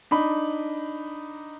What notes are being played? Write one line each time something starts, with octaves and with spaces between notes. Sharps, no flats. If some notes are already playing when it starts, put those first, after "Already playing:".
D4 D#4 B5